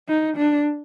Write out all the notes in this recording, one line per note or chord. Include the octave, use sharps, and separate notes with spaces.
D#4
D4